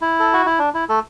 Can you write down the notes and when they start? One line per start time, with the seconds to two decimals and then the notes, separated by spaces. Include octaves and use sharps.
0.01 E4
0.20 A4
0.33 F#4
0.46 E4
0.59 D4
0.74 E4
0.89 A3 A4